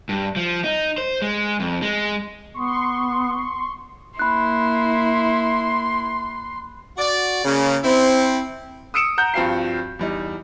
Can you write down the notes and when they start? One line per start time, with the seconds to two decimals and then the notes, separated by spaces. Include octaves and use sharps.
0.09 G2
0.36 F3
0.64 D#4
0.98 C5
1.22 G#3
1.60 F2
1.82 G#3
2.54 B3 C6 C#6
4.19 A#3 E4 B5 C6 F#6
6.97 F#4 D5
7.44 C#3 A#3
7.83 C4 E4
8.94 D#6 E6 C#7 D7 E7
9.18 F#5 A#5 G6
9.34 G2 F3 C4 F#4 F5 C7
9.99 E2 G3 D#4